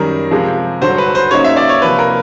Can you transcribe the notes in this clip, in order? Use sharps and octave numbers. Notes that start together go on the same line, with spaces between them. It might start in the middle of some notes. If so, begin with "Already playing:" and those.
Already playing: F#2 D#3 G3 A#4
C3 F3 G#3
G2 D3 F#3 C5
B4
C5
C#3 F#3 A#3 D#4 C#5
E5
D5
C#5
C3 F3 A#3 D4 B4
A#4